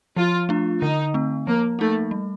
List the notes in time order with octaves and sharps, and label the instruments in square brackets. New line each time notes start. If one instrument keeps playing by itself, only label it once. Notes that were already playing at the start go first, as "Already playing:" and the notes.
[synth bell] F3 [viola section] F4
[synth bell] A3 D4 F4
[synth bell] D3 [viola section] D#4
[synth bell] A3 C4
[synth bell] F3 [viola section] A#3
[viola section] A3 [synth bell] A#3 D#4
[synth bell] G3